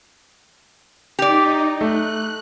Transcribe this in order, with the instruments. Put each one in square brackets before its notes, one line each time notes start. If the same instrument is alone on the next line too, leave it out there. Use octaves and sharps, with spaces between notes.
[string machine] D#4 [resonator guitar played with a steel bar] G4 D5
[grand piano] A3 [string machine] F#6